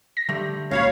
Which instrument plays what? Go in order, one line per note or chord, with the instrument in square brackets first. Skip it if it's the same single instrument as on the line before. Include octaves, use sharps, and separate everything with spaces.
[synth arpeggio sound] A#6
[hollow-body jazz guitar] D3 G3 A3
[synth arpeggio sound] C#2 [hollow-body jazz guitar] A#2 F#4 B5 [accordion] C#5 F5